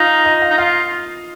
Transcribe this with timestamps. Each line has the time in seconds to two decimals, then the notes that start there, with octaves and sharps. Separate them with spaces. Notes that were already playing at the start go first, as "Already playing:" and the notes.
Already playing: D#4 F4
0.25 D#5
0.41 F5
0.50 D#4
0.58 F4 F5